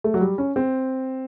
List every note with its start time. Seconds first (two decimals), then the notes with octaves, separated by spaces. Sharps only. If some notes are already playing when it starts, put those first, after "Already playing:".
0.04 A3
0.14 F#3
0.21 G3
0.38 C#4
0.56 C4